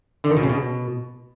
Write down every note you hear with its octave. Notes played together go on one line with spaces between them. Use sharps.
D3
D#3
B2
C#3
B2